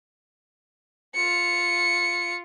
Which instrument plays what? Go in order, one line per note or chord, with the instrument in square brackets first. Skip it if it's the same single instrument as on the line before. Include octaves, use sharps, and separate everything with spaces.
[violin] F4 C#7